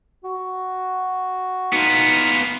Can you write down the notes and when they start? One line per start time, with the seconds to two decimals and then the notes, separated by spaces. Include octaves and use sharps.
0.24 F#4
1.73 B3 D#4 F4